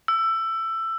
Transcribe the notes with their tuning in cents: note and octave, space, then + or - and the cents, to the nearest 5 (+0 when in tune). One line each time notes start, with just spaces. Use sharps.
E6 +15